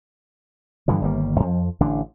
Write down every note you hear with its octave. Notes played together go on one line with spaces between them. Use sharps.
G2 D3 E3 F3
G1 D#3 G3 A#3
F2 F3
A1 D3 D4